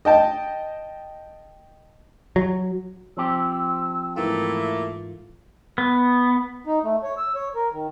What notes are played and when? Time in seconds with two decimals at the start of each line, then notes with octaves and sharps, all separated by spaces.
0.05 D#5 G5 A5
2.36 F#3
3.17 F3 C4 G4 E6
4.16 G#2 E3 A3 A#3 E4 F4
5.78 B3
6.66 D#4
6.84 A3
7.03 C#5
7.17 E6
7.35 C#5
7.55 A#4
7.73 D#3